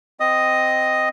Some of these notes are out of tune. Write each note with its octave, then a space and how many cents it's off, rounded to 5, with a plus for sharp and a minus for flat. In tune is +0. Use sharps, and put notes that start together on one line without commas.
C4 -10 D#5 +0 D#6 +0